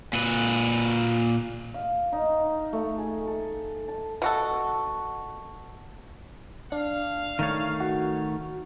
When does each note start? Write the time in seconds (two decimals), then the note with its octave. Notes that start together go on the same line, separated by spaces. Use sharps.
0.13 A#2 B4
1.74 F5
2.13 D#4
2.73 A3
2.98 G#4
3.27 A4
3.88 A5
4.22 B2 F#4 A4
6.72 D4 F5
7.39 D#3 A3 C#5
7.80 F#4